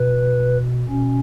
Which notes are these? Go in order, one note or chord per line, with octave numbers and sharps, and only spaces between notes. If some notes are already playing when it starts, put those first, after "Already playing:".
Already playing: B2 B4
B2 C#4